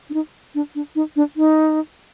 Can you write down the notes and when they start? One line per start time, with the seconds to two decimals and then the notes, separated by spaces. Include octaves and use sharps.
0.10 D4
0.14 D#4
0.55 D4
0.75 D4
0.95 D#4
1.16 D4
1.37 D#4